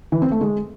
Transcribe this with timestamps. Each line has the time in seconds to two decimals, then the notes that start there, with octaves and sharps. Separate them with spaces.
0.12 E3
0.22 C4
0.31 A3
0.41 G#3